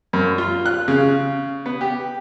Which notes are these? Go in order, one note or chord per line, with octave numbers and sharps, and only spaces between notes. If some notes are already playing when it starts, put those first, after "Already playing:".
F#2
F4
F#6
C#3
B3
G4